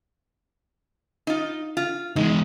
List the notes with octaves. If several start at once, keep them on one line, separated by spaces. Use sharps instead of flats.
D#4 F4
F4
E2 G#3 D#4